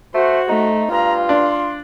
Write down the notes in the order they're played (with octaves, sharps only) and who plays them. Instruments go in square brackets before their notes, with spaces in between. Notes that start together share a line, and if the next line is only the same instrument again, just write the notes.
[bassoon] A3 [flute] F#4 [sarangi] C5
[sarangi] A3 [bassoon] D#4
[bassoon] G2 [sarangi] F4 [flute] A#5
[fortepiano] D4 [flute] C6